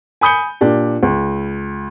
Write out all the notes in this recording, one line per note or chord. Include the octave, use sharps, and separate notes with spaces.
G#5 B5 D#6 G6 C#7 G7
A#2 D4 G4
C#2